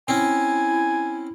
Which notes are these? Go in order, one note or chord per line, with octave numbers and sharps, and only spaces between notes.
C4 C#4 E4 G#5